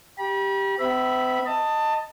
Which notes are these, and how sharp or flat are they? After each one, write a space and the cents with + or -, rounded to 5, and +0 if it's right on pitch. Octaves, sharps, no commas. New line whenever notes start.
G4 +0 B5 -40
C4 -45 E5 +0 B5 -10
D#5 +0 A5 +20